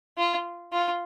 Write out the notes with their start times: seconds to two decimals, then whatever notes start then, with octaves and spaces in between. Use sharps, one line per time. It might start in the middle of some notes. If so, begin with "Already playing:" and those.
0.18 F4
0.73 F4